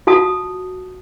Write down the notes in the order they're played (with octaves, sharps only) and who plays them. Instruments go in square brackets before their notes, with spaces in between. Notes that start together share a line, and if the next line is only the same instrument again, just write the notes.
[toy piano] F4 F#4 A5 D#6